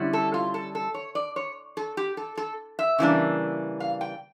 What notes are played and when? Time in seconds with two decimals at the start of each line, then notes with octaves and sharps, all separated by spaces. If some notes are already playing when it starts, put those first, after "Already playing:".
Already playing: D3 G3 C#4 E4
0.13 A4
0.34 F4
0.54 A4
0.75 A4
0.94 C#5
1.15 D5
1.36 C#5
1.77 A4
1.97 G4
2.17 A4
2.37 A4
2.79 E5
2.98 C#3 E3 G3 A#3 D4
3.80 F5
4.01 G5